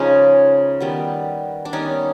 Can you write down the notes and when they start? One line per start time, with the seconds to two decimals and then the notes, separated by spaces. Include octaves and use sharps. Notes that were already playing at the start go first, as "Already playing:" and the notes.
Already playing: C#3 F3 G#3 C#4 D#4
0.80 D#3 G3 B3
1.65 D4
1.73 D#3 G3 B3 C#4 D#4